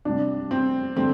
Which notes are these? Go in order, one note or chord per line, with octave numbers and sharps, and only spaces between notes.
C3 G3 D4
C4
D3 G3 C4